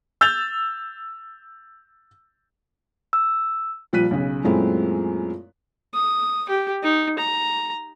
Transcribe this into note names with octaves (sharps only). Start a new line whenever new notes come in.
E6 G6 A6 F7
E6
A#2 F3 G3 F#6 B6 D#7
B1 C#3
F#2 A#2 G#3 A3 C4 E4
D#6
G4
D#4
A#5